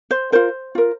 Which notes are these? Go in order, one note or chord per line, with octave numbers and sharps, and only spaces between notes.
C5
F4 A#4 C5
F4 A#4